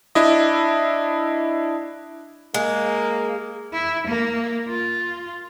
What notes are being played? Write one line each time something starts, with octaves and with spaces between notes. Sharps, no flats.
D4 E4 D#5
G#3 A#3
E4
A#3
F4